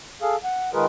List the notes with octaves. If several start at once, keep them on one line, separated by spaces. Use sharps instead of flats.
G#4 A4 F5
F#5
D#3 G#3 F4 G#4 A#4 B4